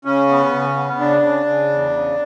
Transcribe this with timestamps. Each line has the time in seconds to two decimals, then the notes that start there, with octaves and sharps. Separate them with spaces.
0.05 C#3 C#4
0.29 B3
0.52 C#3
0.76 B3
0.99 C#3 D4
1.22 C#3
1.46 C#3
1.70 E2
1.92 C#3